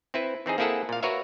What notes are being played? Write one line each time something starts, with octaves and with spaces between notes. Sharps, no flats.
C4 E4 B4
E3 C4 D#4 G#4
A#3 C4 E4 G#4 A4 F#5
A#2 F5
F#4 A#4 B4 C#5 E5 F5